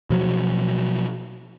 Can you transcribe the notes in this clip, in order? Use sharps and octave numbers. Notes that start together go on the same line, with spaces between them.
B2 F3 F#3